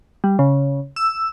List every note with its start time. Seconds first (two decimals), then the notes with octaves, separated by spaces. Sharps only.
0.24 G3
0.39 C#3
0.96 E6